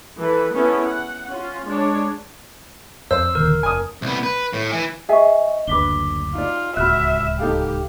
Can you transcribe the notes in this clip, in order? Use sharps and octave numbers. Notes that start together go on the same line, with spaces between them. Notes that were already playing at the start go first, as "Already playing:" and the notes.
E3 A4 B4
B3 C#4 E4 G#4 A4
F#5
C#4 F4
G#3 D4 C#5
F2 C5 E6
D#1 D3 D#3 A#4
F1 G#5 D#6
C2 B3
B4
A2
E3
G#4 D#5 E5 G#5 C#6
F#1 D2 D4 B4 D6 B6 G7
D#4 F4 D5
D1 C#2 F4 F#4 E5 B5 F6 F#6
D#4 G4 A4 F5